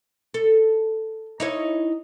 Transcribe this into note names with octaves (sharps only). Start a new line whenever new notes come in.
A4
D#4 E4 C#5